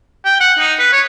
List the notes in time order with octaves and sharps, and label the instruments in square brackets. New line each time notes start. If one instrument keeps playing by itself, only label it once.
[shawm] G5
F#5
D#4
B4
C#5